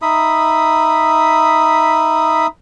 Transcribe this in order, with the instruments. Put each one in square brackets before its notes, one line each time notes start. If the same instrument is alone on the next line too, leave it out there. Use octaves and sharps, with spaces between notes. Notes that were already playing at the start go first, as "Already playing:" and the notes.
[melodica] D#4 E5 B5 D#6